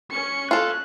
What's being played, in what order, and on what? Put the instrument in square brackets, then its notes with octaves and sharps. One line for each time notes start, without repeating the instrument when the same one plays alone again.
[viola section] C#4 [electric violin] C#7
[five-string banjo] F4 A4 [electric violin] F#6